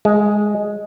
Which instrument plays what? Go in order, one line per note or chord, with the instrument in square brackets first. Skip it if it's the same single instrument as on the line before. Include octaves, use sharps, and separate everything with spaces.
[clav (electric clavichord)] G#3